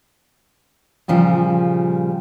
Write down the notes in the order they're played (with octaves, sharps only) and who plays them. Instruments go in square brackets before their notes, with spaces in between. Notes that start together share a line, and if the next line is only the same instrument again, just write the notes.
[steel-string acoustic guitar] A#2 C#3 F3 G3